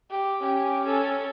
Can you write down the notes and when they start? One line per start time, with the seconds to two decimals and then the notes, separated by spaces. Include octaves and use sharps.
0.10 G4
0.40 C#4 G4
0.84 C#4 A4